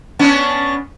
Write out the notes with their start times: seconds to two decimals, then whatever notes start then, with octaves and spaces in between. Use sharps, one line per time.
0.19 B3 C#4 D4